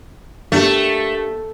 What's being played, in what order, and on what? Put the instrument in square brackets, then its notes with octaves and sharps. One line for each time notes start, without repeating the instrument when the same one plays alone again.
[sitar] A3 [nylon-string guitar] A#3 D4 G4